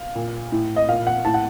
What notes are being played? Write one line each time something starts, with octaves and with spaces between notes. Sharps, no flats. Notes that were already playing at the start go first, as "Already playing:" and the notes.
Already playing: F5
A#2
A2
D#5
A#2 F5
F#5
A2 A5
F#5